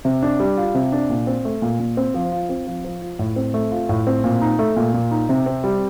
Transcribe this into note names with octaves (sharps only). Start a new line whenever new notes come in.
C3
D4
G3
F4
C3
D4
A#2
C4
A3
A#2
A#2
C4
F3
F4
C4
F3
F3
F4
A2
C4
A3
F4
A2
C4
A#2
D#4
A3
A#2
A#2
D#4
C3
C4
G3